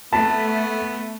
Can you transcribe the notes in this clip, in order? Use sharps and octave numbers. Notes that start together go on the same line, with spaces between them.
A3 B3 A5